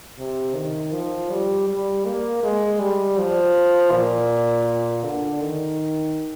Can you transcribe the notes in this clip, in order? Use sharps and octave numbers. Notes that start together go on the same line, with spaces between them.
C3
D#3
F3
G3
G3
A#3
G#3
G3
F3
A#2
D3
D#3